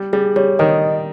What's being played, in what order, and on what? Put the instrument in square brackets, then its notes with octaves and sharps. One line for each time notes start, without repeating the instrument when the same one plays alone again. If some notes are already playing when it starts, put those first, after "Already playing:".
Already playing: [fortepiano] G3
[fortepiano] G3 [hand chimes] G#4
[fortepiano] G3 [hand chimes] C#5
[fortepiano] D#3 [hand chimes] D#5